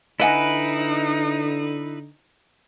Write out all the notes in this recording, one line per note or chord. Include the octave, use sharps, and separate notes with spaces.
D3 D#4 E4 B4 D#5 F#5 G#5